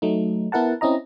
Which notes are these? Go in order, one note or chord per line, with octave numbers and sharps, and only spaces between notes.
F#3 A3 D#4
B3 E4 A#4 F#5 A5
C4 C#4 E4 D#5 A#5